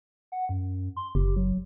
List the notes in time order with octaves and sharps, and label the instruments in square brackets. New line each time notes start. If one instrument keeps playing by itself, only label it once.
[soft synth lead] F#5
F#2
C6
[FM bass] F#1 [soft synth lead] G4
[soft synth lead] F#3